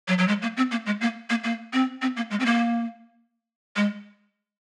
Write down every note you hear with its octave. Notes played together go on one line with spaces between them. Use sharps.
F#3
F#3
G#3
A#3
C4
A#3
G#3
A#3
A#3
A#3
C4
C4
A#3
G#3
C4
A#3
G#3